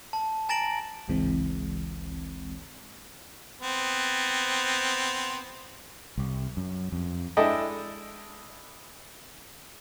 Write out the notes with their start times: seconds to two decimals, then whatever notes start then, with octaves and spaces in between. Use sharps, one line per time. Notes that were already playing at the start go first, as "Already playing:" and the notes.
0.13 A5
0.49 G#5 A#5 A6 A#6 D7 F#7
1.08 G1 C#2 G#2 E3 G#3 C4
3.61 B3 C4
6.18 C2
6.57 F#2
6.92 F2
7.37 G#3 D4 E4 A4 D#5 G5